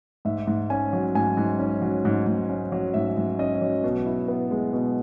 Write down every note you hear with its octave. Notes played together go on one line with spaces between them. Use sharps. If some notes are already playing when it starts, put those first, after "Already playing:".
G#2 E5
G#2
C#4 G#5
F#3
G#2 G#5
G#2
C#4
F#3
G#2
G#2
C#4
F#3
G#2 E5
G#2
C#4 D#5
F#3
B2
E4
B3
G#3
B2